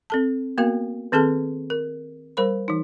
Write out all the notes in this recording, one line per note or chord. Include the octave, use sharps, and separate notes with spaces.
C4 A4 A5
A#3 B3 F#4 A#4 F5
D#3 C4 G#4 A4 A5
A#4
G3 A#4 C5 B5
E3 D#4